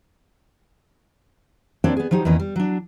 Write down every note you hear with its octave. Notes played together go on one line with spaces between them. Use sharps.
A#3 C4 D4 F#4 C#5 D5
B3 G#4
F3 F#3 D#4 G4
E2 D#3 A#3 C#4 B4 D#5
G3
F#3 D4